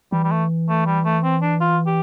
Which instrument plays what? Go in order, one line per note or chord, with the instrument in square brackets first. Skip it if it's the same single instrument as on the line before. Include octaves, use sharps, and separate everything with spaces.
[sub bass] E3 [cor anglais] G3
[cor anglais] G3
A3
A3
G3
A3
C4
D4
F4
G4